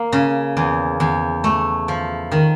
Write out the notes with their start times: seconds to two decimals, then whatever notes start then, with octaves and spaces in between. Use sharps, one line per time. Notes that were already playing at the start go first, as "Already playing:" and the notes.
Already playing: A#3
0.12 C#3
0.57 E2
1.00 E2
1.44 A3
1.88 F3
2.32 D#3